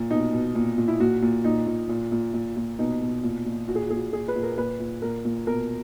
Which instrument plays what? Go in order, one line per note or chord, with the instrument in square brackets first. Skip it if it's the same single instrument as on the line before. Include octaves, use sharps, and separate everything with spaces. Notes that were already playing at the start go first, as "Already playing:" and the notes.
Already playing: [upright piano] A#2
B2 D#4
B2
A#2
A#2
E4
A#2 F#4
A#2
A#2 D#4
A#2
A#2
A#2
A#2
A#2
B2 D#4
B2
A#2
A#2
A#2 F#4
G#4
F#4
A#2 G#4
F#4
A#2 G#4
B4
A#2
A#4
A#2 B4
A#2
A#2 A#4
A#2
B2 A#4